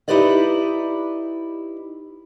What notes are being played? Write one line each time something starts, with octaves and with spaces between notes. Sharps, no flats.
D#4 E4 G4 B4 D5 D#5